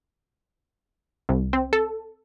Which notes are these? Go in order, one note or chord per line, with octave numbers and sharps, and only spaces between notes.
C2
C4
A4